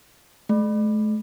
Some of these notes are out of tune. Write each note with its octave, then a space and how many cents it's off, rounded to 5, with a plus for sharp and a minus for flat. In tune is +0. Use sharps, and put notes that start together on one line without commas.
A3 -45